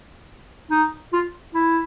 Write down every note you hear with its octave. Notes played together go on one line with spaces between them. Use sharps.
D#4
F4
E4